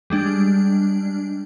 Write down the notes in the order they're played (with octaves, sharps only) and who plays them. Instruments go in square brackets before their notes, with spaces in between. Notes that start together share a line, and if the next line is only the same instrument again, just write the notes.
[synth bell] G3 G#3 D4